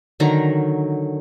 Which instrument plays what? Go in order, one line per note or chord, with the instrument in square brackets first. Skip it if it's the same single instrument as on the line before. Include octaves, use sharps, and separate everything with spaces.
[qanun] D3 D#3 F#3 A#5